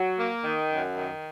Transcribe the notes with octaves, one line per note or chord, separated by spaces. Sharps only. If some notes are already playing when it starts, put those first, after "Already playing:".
Already playing: F#3
A#3
D#3
F#2
D#3